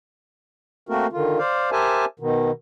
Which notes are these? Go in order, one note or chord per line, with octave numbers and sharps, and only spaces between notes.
A3 A#3 C4 F#4 A#4
D3 D#3 F4
C5 D5 F5
G4 A#4 C5 E5 G#5 A5
B2 D#3